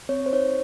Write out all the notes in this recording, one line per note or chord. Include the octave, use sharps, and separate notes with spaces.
C4 C#5
C5
D#4 C#5